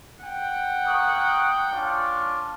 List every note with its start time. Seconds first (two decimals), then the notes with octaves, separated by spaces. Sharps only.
0.24 F#5 G5
0.87 A#3 C#6 D#6
1.73 C#4 D4 F4